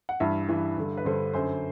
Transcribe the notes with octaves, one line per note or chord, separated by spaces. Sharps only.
F#5
G2 E3 E5
G2 E3
G2 D3
B4
G2 D3 C5
F#2 D3 C5